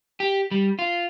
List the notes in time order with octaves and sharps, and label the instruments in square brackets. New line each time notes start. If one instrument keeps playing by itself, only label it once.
[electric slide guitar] G4
G3
F4